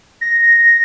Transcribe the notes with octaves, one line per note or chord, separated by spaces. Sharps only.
A#6